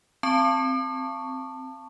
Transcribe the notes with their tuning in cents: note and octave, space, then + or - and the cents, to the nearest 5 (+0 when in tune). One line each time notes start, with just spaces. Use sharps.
C4 +0 A5 +15 C#6 +15